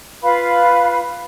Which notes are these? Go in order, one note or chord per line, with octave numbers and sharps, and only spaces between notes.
F4 B4 F5 B5